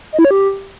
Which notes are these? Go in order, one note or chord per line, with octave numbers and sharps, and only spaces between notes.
D#5
E4
C#5
G4